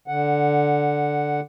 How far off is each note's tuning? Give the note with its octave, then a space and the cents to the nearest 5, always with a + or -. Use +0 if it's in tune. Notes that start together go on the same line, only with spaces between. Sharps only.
D3 -5 F#5 +0